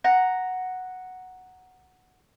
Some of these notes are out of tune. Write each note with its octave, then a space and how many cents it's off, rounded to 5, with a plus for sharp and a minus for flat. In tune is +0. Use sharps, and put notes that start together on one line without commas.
F#5 +0 A#5 +0